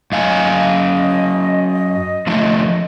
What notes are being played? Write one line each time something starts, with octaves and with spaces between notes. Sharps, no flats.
F#2 D#5 F5 G#5
D3 F3 A3